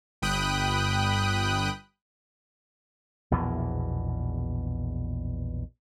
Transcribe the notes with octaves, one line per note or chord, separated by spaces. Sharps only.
G1 G5 B5 D#6 F#6
A#1 E2 B2 E3